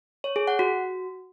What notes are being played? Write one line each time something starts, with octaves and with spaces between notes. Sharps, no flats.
C#5
G#4
F#5
F#4